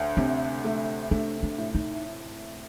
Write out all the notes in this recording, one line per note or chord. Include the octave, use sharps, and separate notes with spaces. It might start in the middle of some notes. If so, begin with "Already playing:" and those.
Already playing: D2
C3 D4
A3
A3 D4
D4
A2
D#4